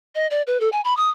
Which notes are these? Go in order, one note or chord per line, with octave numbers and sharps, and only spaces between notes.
D#5
D5
B4
A4
G#5
B5
D#6